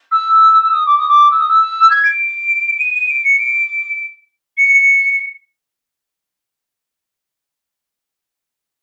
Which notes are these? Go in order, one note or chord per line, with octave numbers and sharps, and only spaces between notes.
E6
D#6
D6
D#6
D6
E6
D#6
E6
G#6
D7
D#7
D#7
D7
C#7
D7
C#7